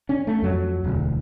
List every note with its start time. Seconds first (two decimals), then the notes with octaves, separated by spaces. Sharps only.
0.09 C#4 D4
0.27 A3
0.42 F2 F#3
0.84 E1 D2